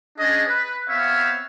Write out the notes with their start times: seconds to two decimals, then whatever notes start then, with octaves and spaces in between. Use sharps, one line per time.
0.18 C#4 D4 G#4 D#5
0.47 B4
0.89 B3 C4 C#5 E5 F5